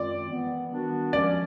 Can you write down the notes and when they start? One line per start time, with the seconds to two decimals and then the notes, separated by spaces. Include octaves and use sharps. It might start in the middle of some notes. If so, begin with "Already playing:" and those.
Already playing: F#2 D#3 G#3 C4 F4 D5
0.29 E3 G3 B3
0.71 D#3 G3 B3 D4 F#4
1.13 F3 G#3 C#4 D5